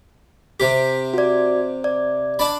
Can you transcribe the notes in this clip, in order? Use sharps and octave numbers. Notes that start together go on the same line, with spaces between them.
C3 G4 B6
F#4 D5
D5
D4 A5 B5